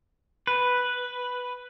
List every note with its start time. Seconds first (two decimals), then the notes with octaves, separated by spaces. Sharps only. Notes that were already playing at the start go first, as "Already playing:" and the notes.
0.47 B4